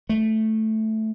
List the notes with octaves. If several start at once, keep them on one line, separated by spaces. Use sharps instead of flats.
A3